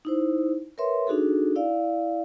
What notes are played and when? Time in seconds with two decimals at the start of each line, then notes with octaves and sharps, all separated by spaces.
0.05 D#4 E4 C5
0.78 A#4 B4 C#5 E5 C6
1.07 D4 D#4 F#4 G#4 A4
1.56 E4 D5 F5